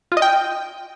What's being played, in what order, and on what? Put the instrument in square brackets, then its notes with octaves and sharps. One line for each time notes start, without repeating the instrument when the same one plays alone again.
[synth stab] F4
D#5
G5